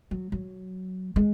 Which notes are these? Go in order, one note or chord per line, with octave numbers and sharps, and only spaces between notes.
F#3
F#3
G#3